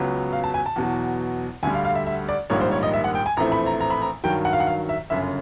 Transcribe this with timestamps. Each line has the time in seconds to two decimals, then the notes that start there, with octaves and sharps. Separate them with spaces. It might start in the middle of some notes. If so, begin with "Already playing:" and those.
Already playing: C#2 C#3 F#3 B3
0.33 F5
0.44 A5
0.54 G#5
0.66 A5
0.76 E2 B2 F#3
1.63 D2 D3 G3 G#5
1.74 F5
1.85 F5
1.95 E5
2.07 E5
2.29 D5
2.50 A#1 G#2 D#3 G3 A#3 C#5
2.61 C5
2.71 C#5
2.83 D#5
2.94 E5
3.04 F#5
3.15 G5
3.26 G#5
3.37 A#1 A2 E3 A3 C4 A#5
3.52 B5
3.66 A#5
3.81 A#5
3.90 B5
4.02 A#5
4.24 G2 D#3 F#3 G5
4.45 F#5
4.53 F5
4.60 F#5
4.67 F5
4.89 E5
5.10 G1 F#2 C#3 E5